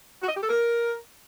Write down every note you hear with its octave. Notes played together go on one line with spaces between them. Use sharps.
F#4
D#5
G4
A4
A#4